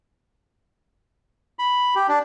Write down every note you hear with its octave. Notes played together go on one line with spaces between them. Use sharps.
B5
G4
D4